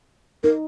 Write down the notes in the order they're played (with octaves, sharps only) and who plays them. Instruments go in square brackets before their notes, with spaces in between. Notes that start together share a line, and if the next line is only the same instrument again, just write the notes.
[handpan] D#4 [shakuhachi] A#4